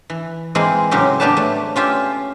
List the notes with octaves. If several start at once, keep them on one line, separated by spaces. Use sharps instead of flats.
E3
E3 G#3 A#3 C4 G#4
A2 C#3 F#3 C4 C#4 G4
A#3 B3 D4 G4 B4 A5
A3
C#4 F4 G4 E5